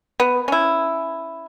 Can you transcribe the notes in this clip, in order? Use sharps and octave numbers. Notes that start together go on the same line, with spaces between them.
B3
C#4 E4